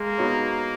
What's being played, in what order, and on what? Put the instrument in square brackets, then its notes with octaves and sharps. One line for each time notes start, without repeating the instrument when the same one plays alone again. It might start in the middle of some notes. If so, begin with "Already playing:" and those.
Already playing: [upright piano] G#3 [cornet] A#3
[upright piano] B3 D#4 F#4 C#5